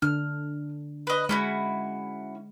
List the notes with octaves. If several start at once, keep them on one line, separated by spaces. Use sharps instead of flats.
D3 D4 F6
B4 D#5
G#3 C#4 E4 F#4